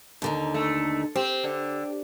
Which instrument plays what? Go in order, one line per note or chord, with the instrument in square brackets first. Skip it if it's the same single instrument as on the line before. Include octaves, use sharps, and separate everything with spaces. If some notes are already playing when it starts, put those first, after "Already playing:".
[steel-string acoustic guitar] D#2 D3 D#4
[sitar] A3
[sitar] C4 [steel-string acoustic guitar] G4
[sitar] D3